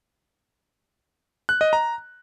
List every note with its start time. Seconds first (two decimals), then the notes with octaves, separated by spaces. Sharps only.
1.49 F#6
1.61 D#5
1.73 A#5